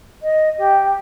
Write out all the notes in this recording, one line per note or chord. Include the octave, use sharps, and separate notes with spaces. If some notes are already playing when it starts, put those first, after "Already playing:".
D#5
G4